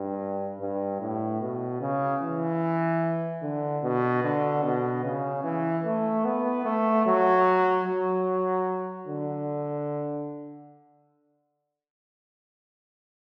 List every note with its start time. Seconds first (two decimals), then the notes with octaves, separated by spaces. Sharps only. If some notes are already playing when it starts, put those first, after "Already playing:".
Already playing: G2
0.60 G2
1.01 A2
1.41 B2
1.81 C#3
2.22 E3
3.43 D3
3.84 B2
4.24 D3
4.63 B2
5.04 C#3
5.44 E3
5.85 A3
6.25 B3
6.65 A3
7.06 F#3
7.86 F#3
9.08 D3